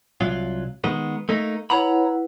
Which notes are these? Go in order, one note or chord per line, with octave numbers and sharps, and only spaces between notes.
C2 F#3 F4
D#3 G#3 B3
A3 A#3 D#4
E4 B4 C#5 F#5 A#5 B5